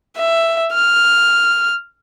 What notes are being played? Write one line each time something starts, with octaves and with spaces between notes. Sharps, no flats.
E5
F6